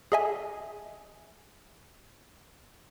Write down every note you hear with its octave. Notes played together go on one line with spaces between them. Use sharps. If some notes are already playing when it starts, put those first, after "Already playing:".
G#4 A4 D#5 E5 G#5